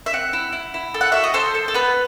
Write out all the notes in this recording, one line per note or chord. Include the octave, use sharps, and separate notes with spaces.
E5
C4 F#5
E4
E4
E4
A4
F#5
F#4 E5
D#5
A4 C5
A4
A4
B3 B4